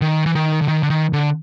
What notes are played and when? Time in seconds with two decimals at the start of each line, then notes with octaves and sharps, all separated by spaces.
0.01 D#3
0.26 E3
0.35 D#3
0.61 D3
0.68 D#3
0.83 D3
0.90 D#3
1.13 D3